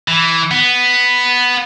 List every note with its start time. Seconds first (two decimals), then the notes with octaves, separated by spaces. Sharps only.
0.08 E3
0.51 B3